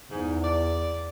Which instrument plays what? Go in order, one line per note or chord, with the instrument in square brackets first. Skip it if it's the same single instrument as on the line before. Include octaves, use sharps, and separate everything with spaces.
[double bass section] E2 [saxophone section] G#2
[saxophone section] D5